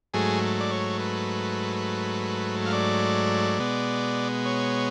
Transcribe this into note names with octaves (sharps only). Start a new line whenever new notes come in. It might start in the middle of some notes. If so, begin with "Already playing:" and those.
G#2 F#3 A3 G#4
D5
C#5
B4
F5
D5
B2 G#3 B3
C#5